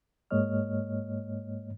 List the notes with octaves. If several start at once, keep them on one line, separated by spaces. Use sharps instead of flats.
G#2 G#3 A#3 C#5 D#5 F6